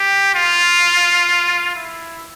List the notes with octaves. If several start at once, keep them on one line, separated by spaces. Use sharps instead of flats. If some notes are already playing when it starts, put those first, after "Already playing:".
Already playing: G4
F4
E4